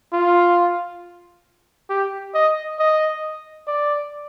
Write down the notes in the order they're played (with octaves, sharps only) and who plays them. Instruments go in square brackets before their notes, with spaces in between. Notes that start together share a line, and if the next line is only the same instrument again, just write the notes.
[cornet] F4
G4
D#5
D#5
D5